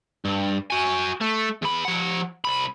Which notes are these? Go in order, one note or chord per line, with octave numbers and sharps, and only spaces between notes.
G2
F#4 G#5
A3
E2 B5
F3 F#5
C2 B5